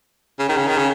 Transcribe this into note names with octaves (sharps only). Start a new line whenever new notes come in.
C#3
D#3
C#3
D#3
C#3